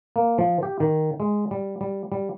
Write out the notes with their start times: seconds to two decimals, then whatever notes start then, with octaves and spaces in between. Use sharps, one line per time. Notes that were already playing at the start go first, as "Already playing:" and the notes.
0.16 A#3
0.38 F3
0.63 G4
0.80 D#3
1.20 G#3
1.51 G3
1.81 G3
2.12 G3